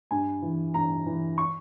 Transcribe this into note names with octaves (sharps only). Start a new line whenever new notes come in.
G2 G#5
E3
G2 A#5
E3
C#6